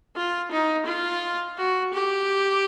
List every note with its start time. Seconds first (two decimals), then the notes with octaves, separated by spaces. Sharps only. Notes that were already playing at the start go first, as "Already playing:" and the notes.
0.16 F4
0.51 D#4
0.86 F4
1.58 F#4
1.94 G4